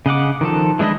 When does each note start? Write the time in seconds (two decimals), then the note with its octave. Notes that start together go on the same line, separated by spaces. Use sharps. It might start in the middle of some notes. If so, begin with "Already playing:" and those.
0.06 C#3 D#5 F#5 D6
0.41 D#3 F3 A4
0.79 E3 G#3 D4 E4 D#5